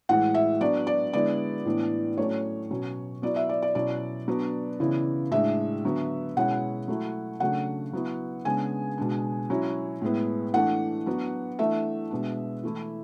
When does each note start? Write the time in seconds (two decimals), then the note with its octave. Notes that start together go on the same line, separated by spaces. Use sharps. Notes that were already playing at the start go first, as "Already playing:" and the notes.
0.09 A2 E3 G#3 F#5
0.34 E5
0.61 F#3 B3 D4 D5
0.87 D5
1.13 D3 G#3 B3 E4 D5
1.65 A2 E3 B3 D4
2.17 A2 F#3 A3 C#4 C#5
2.71 B2 F#3 C#4
3.22 F#3 B3 E4 D5
3.36 E5
3.49 D5
3.62 D5
3.75 B2 F#3 C#4 E4 D5
4.28 F#3 B3 D4
4.80 C#3 E3 B3 E4
5.31 A2 G#3 D4 E5
5.84 D3 F#3 B3
6.37 B2 G#3 C#4 E4 F#5
6.88 F#3 A3 E4
7.40 C#3 F#3 A3 D4 F#5
7.93 F#3 B3 E4
8.45 C#3 G#3 B3 D4 G#5
8.98 B2 G#3 D4
9.50 F#3 C#4 E4
10.02 A2 G#3 B3 E4
10.54 E3 A3 D4 F#5
11.06 F#3 B3 D4
11.59 E3 A3 D4 E5
12.11 B2 G#3 B3 D4
12.64 E3 A3 E4